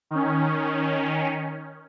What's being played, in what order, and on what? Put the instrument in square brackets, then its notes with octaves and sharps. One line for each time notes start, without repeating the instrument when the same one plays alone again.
[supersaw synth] D#3 C#4